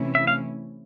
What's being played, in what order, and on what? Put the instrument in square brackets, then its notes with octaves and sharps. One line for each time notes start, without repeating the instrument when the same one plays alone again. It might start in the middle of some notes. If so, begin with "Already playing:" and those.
Already playing: [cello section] C3 E3 A3 C#4 E4
[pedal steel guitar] E5
F5